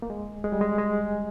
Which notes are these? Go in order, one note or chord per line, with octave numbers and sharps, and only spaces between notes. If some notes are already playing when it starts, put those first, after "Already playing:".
A#3
G#3
G#3
G3
G#3
G#3